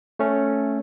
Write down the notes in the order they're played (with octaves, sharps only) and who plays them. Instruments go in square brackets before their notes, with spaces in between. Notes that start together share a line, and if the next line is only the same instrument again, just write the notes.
[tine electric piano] A3 C#4